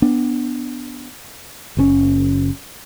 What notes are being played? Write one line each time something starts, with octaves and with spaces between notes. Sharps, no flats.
B3 D4
F#1 A#2 C#4